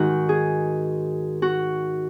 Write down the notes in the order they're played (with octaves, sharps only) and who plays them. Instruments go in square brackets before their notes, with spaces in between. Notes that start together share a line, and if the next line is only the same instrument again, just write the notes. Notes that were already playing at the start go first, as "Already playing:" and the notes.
Already playing: [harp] G#2 D#3 F#4
G#4
F#4